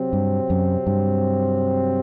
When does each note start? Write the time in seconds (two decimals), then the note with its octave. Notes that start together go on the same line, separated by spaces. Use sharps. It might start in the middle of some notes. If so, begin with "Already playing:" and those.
Already playing: C3 F#3 C4
0.13 G2
0.50 F#2
0.87 G2